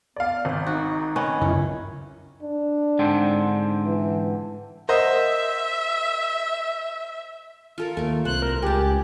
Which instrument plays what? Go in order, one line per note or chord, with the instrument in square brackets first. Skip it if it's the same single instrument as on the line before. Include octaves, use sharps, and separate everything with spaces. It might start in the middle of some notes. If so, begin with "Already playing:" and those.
[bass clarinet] B3 [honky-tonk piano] D5 F5
[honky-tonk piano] G#1
[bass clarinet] D#4 [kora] F#4
[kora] D#3 B3 C#4
[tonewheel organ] F#2 C#3 E4 [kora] C#4 [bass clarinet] A#4
[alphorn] D4
[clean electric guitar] G#2 D3 C4
[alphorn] E3
[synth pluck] A#4 F#5 [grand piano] C5 D#5 [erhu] E5
[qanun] F4 A4 A#4
[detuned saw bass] D#2 [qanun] A3 A#4
[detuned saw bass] C2 [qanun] C5 [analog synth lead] F#6
[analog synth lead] A#4
[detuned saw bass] C#2 [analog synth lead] G4 [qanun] G#4 A5